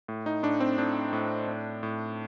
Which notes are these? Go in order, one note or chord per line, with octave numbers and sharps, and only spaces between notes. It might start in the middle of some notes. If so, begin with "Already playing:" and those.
A2
D#4
A2 D4
C4
A2 D4
A2
A2
A2